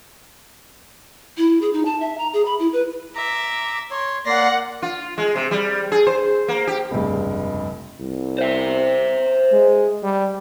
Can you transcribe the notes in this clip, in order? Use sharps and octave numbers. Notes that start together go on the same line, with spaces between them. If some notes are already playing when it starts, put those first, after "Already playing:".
E4
G#4
D#4
A5
E5
A#5
G#4
B5
E4
B4
E5 A#5 D6
C#5 C6
A#3 D5 F#5 C6 A#6 C7
F4
G#3
C3
G3
G#4
C5
A#3
G4
F1 C#2 G2
C2
C5 E5
G#3
G3